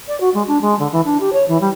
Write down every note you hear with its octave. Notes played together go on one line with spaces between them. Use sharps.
D5
F#4
G#3
D4
G#3
D3
E3
D4
G4
C#5
E3
G3